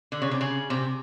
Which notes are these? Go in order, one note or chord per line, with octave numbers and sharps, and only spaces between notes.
D3
C#3
C3
C#3
C3